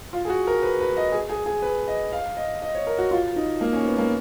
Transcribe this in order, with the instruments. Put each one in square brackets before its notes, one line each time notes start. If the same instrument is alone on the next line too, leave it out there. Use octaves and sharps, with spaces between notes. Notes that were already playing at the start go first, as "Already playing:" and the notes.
[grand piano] F4
G#4
F#4
A#4
B4
B4
D#5
G#4
G#4
G#4
B4
D#5
F5
D#5
D#5
C#5
A#4
F#4
F4
D#4
A#3
C#4
B3
A#3